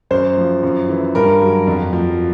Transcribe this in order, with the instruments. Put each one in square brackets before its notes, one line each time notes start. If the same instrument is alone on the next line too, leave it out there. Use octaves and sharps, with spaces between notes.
[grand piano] F#2 C5
F3
F#2
E3
G2 A#4
F#3
F2
F3